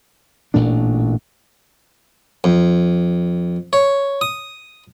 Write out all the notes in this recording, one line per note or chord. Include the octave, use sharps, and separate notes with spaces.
A1 A#2 A3 D4
F2
C#5
D#6